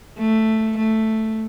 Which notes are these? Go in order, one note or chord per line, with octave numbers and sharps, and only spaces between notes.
A3
A3